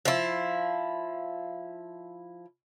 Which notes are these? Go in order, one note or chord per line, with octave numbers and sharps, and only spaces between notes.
F3 E4